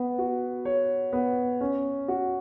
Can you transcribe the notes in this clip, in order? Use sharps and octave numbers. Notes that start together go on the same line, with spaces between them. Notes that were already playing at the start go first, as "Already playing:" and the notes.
Already playing: B3
F#4
C#5
B3
C#4
F#4